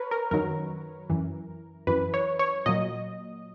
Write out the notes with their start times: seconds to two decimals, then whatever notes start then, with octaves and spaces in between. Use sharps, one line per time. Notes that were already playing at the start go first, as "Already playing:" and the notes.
Already playing: A#4 B4 C#5
0.11 A#4
0.31 F#2 D#3 F#3 A#4
1.10 F#2 E3
1.87 F#2 E3 B4
2.14 C#5
2.39 C#5
2.66 A#2 F#3 D#5